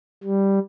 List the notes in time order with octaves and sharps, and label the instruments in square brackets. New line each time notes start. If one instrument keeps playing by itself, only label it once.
[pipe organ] G3